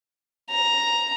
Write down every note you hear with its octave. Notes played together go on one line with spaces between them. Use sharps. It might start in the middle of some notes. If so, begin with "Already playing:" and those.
A#5